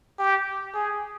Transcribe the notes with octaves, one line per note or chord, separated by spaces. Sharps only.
G4
G#4